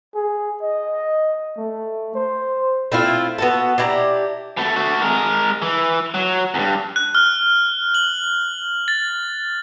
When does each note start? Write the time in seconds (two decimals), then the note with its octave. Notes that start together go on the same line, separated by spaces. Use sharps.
0.15 G#4
0.62 D#5
1.57 A3
2.15 C5
2.92 A3 C4 E4 F4
3.38 B3 F#4 A4
3.78 D4 E4 G4 A#5
4.57 B2 A3
4.76 A3 F#4
5.02 G#3 A#4
5.62 E3
6.14 F#3
6.54 E2 G2
6.96 F#6
7.15 F6
7.94 F#7
8.88 A6